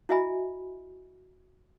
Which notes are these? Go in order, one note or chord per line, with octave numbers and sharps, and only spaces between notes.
E4 F#4 D#5 E5 G#5 B5